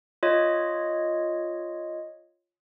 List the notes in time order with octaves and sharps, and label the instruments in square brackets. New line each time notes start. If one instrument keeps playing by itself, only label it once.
[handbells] F4 C#5 D#5